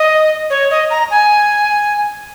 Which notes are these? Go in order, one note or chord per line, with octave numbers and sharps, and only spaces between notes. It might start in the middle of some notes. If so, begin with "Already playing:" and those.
Already playing: D#5
C#5
D#5
A#5
G#5